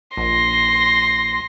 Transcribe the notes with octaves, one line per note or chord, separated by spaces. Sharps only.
A#1 C6 A#6